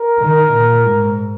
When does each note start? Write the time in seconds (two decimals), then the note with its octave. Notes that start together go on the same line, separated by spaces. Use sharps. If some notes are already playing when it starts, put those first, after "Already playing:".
Already playing: A#4
0.19 D#3
0.52 A#2
0.84 G#2